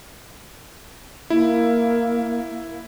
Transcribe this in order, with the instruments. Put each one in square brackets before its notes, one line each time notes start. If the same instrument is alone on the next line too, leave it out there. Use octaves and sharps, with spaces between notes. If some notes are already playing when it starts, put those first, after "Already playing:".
[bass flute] A#3 [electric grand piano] E4